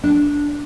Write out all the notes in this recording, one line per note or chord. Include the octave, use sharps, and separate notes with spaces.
D4